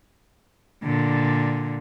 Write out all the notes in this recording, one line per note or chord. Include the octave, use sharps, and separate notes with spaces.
A#2 D3